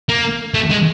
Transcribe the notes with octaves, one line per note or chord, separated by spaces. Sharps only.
A#3
A3
G#3